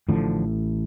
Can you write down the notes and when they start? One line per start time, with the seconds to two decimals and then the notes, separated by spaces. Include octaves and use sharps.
0.09 A1 A2 D3 F3